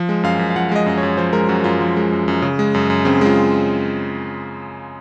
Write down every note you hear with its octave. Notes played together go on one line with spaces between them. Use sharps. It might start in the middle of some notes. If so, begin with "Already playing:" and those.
Already playing: F3
G#3
F#2 F5
F#2
F5
F3 F#5
F5
G#3 D#5
F#2 D#5
C#5
F#2
F3 C5
G#3 A#4
F#2 F#4
F#2 F4
F3
G#3
F#2
F#2
C#3
G#3
F#2
F#2
C#3 C4
G#3 F4